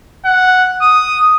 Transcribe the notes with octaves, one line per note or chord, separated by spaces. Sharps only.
F#5
D#6